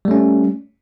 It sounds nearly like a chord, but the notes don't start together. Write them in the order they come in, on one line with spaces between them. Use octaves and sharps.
G3 A3 C#4